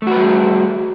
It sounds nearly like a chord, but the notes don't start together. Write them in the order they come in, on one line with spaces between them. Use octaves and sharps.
A3 F#4 B4 G3 G#4